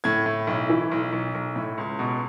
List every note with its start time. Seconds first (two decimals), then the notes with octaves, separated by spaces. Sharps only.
0.04 A2 G#6
0.26 A2
0.47 B1
0.69 E3
0.91 B1
1.13 B1
1.34 B1
1.56 A2
1.78 C#2
1.99 B2